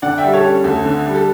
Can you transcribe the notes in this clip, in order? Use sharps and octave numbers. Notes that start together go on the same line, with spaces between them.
D3 D5 F#5
E5 G5
G3
A4 C#5
C#4
D2 A4
D3
G3
A4